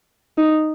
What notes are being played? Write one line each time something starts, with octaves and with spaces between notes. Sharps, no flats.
D#4